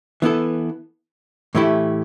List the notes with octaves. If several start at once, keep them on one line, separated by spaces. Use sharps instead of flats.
E3 B3 E4 A4
A2 E3 A3 E4 G4